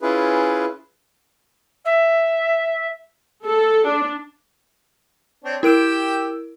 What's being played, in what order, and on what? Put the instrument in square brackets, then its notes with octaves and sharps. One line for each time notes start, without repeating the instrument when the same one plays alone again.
[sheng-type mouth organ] C#4 E4 F4 G#4 B4
[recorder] E5
[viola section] A4
D4
[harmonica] C4 D4 C#5
[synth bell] E4 A#4 D7 [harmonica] G4 G5 E6